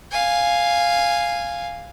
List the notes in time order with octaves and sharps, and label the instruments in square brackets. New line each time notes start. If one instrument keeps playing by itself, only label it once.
[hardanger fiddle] F5 G#5